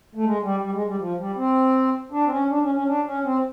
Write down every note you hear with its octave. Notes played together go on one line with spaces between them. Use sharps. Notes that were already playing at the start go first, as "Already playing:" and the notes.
A3
G#3
G3
G3
G#3
G3
F3
G3
C4
D4
C4
C#4
D4
C#4
C#4
D4
C#4
C4